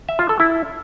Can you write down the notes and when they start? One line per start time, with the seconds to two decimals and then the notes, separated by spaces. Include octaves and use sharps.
0.09 E5
0.19 F4
0.29 A4
0.40 E4